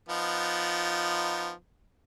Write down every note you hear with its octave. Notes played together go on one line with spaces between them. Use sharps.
F3 B3 D#4